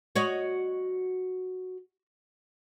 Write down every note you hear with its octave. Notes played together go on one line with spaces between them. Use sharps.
F#4 C#5 D#5